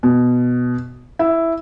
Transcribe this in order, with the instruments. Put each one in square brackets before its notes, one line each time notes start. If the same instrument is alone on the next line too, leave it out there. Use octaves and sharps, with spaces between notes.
[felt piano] B2
E4